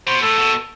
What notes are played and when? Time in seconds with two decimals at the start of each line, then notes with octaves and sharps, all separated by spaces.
0.07 B2 C5
0.22 A2 A4
0.38 B2